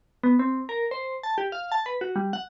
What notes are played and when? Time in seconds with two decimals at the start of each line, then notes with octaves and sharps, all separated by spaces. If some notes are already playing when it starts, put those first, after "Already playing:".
0.23 B3
0.39 C4
0.69 A#4
0.91 C5
1.23 A5
1.38 G4
1.52 F5
1.72 A5
1.86 B4
2.01 F#4
2.16 G3
2.33 F#5